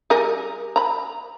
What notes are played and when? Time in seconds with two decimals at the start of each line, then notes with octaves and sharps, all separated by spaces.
0.10 G3 G#4 A#4
0.76 A#5 B5